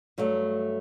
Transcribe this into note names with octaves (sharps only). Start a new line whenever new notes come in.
G2 F#3 A3